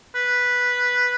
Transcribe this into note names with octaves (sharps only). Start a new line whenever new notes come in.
B4